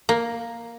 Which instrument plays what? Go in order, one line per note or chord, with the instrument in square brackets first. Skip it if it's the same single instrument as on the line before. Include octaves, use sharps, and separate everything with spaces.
[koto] A#3